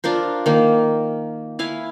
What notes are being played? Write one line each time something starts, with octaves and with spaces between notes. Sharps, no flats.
D4 F4 A#4 C5
D#3 A#3
E4 F5 G#5